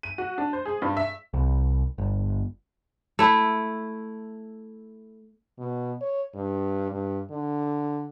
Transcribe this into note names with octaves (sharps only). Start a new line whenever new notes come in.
D#7
F#4
D4
C5
G#4
G2
E5
C2
G1
A3 E4
B2
C#5
G2
G2
D3